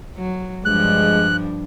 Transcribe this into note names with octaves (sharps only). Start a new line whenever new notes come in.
F#3
G2 F3 G#3 D4 F#6